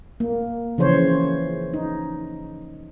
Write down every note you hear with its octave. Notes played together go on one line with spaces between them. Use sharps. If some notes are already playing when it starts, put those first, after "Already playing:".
A#3
C#3 E3 F3 C5 C#5
D#4